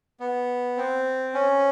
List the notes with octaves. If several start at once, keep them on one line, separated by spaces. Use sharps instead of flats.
B3
C4
C#4